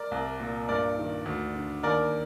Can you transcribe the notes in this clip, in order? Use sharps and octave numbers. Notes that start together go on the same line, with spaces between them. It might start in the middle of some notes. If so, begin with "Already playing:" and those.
Already playing: A#4 D5
C2
A#2
G2 A#4 D5
D#3
D2
D3
D#2 A#4 D5